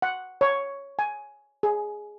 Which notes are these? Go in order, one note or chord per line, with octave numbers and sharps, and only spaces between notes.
F#5
C#5
G#5
G#4